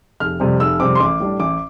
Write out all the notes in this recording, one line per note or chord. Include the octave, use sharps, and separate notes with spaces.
F1 F6
F2 C3 G3 C4
F1 E6
F2 C3 G3 C4 D6
C6
A1 D6
A2 G3 D4
A1 D6